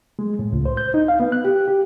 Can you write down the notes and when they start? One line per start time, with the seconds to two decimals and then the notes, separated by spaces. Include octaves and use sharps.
0.19 G#3
0.39 A2
0.53 C#2
0.65 C5
0.77 G6
0.94 D#4
1.08 F5
1.20 B3
1.32 F#6
1.45 G4
1.68 G4